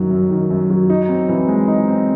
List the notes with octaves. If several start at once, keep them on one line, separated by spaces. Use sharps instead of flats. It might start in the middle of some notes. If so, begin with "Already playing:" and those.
Already playing: F#2 D#3 F#3
F#2
D#3
F#2
F#3
D#4
C4
E3
G#3
D#4
C4